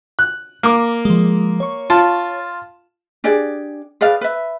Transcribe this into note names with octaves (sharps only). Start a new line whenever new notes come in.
F#6
A#3 D6
F3 G#3
C#5 C#6
F4 A5
D4 G4 G#4 D5
G#4 B4 D5 F5
B4 E5